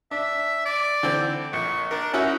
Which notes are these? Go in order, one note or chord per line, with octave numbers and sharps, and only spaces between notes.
D4 E5
D5
D3 E3 C4
A#1 C#6
D4 A#4
C#4 D#4 E4 F#4